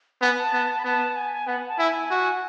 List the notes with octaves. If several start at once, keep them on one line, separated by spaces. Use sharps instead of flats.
B3 G#5
A5
B3
B5
B3 A5
G#5
B3 F#5
A5
E4 G#5
F#4